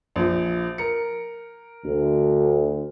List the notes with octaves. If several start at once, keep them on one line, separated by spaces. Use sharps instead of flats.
A#1 F3
A#4 C#7
D2 D3